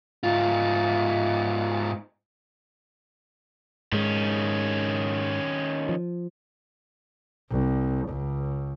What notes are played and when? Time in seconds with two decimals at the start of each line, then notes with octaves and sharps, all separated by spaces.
0.23 G#2 F4
3.92 G#2 D#3 G#3 C#4
5.89 F3
7.50 C2
8.09 C#2